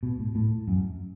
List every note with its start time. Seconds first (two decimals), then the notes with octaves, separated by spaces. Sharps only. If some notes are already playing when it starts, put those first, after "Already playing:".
0.03 B2
0.19 A2
0.35 A2
0.68 F#2